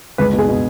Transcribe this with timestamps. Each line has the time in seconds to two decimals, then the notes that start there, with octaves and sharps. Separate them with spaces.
0.18 C#2 B4
0.33 B2
0.39 G#4
0.48 B2